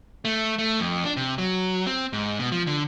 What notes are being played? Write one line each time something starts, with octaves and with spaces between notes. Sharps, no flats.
A3
A3
F2
D4
C3
F#3
C4
G#2
B2
F3
D3